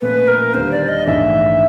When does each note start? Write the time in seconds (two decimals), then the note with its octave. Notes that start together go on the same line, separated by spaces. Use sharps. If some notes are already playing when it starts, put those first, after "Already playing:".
0.01 A#2 F3 A3 C#4 B4
0.28 A#4
0.54 D#2 D3 G3 C5
0.71 D5
0.88 D#5
1.06 A#1 G#2 E3 A3 D4 E5